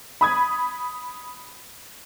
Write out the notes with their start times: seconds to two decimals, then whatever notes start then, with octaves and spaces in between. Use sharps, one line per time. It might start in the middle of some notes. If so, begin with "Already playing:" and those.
0.21 B5 D#6 G#6